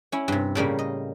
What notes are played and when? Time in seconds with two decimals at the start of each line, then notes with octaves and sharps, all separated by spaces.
0.12 C#4 E4
0.28 G2 C3
0.55 A2 C#3 G3 A#3
0.79 D#5